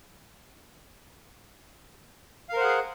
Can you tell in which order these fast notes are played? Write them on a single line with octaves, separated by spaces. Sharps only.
F5 A#4 C5 F#5 G#4